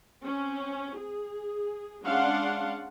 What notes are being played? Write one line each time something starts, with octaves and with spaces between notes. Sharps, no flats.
C4 C#4
G#4
G#3 C#4 D4 F5 F#5 C6